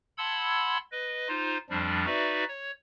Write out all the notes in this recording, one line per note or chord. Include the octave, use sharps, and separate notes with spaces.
F#5 A5 B5 C6 E6 G#6
B4 D#5
D#4 F4 C5
F2 F3 G3 D4
D#4 F#4 B4 D5 E5
C#5